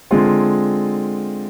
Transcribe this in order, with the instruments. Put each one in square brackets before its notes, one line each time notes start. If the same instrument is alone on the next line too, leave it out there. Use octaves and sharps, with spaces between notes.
[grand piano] D3 G#3 C4 F4